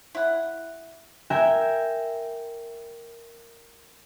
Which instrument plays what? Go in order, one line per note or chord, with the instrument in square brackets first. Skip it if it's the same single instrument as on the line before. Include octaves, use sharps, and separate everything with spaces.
[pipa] E4 F#5
[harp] A#4 E5 G5 G#5 G6